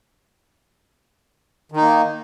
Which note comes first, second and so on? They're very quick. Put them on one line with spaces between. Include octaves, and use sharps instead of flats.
D#3 D#4 A#3